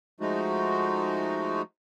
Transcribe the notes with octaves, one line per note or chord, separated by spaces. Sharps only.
F3 G#3 A3 D#4 F#4